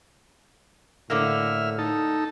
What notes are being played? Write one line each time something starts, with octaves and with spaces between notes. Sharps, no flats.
A2 D3 A#3 E5 F6
D#4 A4